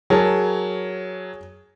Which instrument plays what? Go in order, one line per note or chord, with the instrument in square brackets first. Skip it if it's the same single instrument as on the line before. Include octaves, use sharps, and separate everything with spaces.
[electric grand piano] F#3 A#4 A5 [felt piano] G#4 C#5